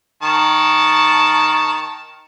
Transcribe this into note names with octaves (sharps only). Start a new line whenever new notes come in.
D#3 A5 C#6